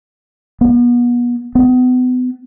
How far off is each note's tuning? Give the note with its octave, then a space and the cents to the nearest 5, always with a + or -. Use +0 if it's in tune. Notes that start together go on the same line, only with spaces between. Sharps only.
B3 -35
B3 +35